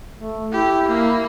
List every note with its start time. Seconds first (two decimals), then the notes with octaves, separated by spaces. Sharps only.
0.17 A3
0.52 E4 G4
0.88 A#3